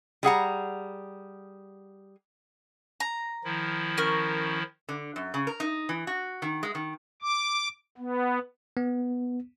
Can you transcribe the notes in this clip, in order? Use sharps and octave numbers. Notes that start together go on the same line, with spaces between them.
G3 G#4 F#5 A#5
A#5
D#3 F3 E4
C#4 A#4 F6
D3
F#2
C#3
A#4
D#4
E3
F#4
D#3
G#3
D#3
D6
B3
B3